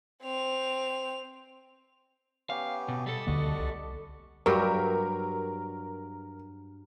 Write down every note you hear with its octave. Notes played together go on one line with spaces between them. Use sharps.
C4 F7
B3 C#4 G4 F5
B2
G3 A4 D#6 E6
D2 D3 A#3 F#4 D5 D#5
C2
G2 F#3 G4 A#4